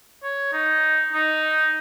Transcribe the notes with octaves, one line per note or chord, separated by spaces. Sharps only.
C#5
D#4
D#4